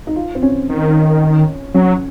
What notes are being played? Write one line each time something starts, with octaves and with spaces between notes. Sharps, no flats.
D#4
F4
C4
C#4
D#3
F#3 C#4